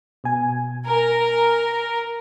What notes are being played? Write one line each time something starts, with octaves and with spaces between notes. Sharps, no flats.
B2 G#5
A#4